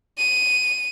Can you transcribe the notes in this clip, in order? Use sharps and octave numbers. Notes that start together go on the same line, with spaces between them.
D#7